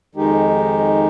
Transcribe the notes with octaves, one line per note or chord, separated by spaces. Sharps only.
F2 D#3 G#3 D#4 G4